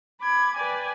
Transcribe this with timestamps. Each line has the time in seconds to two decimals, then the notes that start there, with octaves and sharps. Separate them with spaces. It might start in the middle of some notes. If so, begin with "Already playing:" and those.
0.20 B5 D6 G#6
0.55 B4 D5 G5 G#5